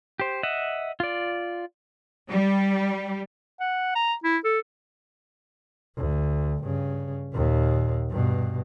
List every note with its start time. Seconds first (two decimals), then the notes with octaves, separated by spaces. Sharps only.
0.20 G4 C5
0.43 D#5 E5 F#5
1.00 F4 D5
2.30 G3
3.60 F#5
3.95 A#5
4.24 E4
4.44 A4
5.97 D2
6.63 G2 C#3
7.32 D#2 A#2
8.10 G2 B2